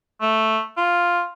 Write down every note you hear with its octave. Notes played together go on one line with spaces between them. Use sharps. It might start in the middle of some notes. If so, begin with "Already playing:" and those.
A3
F4